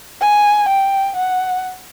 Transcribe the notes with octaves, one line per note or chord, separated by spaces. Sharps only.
G#5
G5
F#5